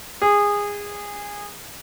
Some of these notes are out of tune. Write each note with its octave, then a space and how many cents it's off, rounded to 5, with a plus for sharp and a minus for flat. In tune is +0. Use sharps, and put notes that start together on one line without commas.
G#4 -20